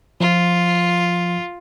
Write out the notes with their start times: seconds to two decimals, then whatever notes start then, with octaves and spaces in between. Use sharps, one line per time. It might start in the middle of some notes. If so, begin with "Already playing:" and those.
0.20 F3 F4